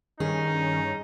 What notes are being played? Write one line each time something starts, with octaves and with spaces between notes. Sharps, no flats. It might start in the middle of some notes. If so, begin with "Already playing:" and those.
G2 D#3 C#4 D#4 G#4